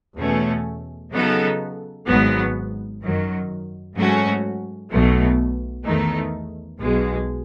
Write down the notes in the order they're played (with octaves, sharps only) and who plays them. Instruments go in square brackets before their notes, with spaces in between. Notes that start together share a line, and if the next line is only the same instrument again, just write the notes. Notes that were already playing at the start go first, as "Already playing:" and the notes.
[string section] E2 B2 A3 C#4
C#3 F#3 B3 D#4 A4
G#1 G#2 F#3 B3
F#2 D#3 F#3
G#2 F#3 A3 C#4 F#4
B1 B2 F#3 A3
E2 D#3 A3 D#4
B1 B2 G#3